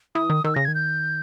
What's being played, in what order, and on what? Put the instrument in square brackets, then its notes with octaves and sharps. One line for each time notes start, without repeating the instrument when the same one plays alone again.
[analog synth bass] E3 [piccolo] D#6
[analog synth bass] D#3
[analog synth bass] D#3 [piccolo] E6
[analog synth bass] C#3 [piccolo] A#6
[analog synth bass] D#3 [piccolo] G#6
[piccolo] G6